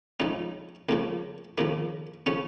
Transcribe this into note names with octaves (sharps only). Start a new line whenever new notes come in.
C#2 C#3 F3 D#4
C#2 C#3 F3 A#3
D#2 C#3 F3 A#3
C#3 F3 C#4